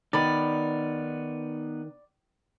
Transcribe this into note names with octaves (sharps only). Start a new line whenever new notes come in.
D#3 B3 D#4 D5 B5